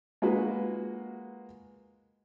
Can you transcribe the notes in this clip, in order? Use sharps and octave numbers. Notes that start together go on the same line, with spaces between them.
G#3 A#3 F4 F#4 B4